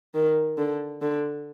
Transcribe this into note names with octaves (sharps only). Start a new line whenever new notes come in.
D#3
D3
D3